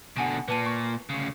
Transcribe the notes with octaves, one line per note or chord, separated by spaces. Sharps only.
B2 D3 F#5 G#5 D7
A#2 B4 A5 D#7
C#6
D2 C#3